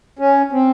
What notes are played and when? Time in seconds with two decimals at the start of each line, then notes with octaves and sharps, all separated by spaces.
0.19 C#4
0.52 C4